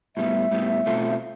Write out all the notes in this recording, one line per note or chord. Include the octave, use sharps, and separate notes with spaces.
A2 G3 B3 E5
A2 G3 B3
B2 A3 C4 F4 A4